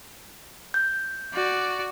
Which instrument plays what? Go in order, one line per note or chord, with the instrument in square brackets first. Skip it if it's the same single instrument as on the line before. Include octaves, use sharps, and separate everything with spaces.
[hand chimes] G6
[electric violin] F#4 D5